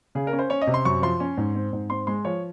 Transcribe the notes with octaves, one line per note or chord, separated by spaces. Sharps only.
C#3 G#4
A#4
C#4
C5
C#4 C#5
D#5
C3
C6
F#2 C#6
F3 C6
C#4
G#2
C4
G#2
C4 C6
G#3 C6
F3 C#5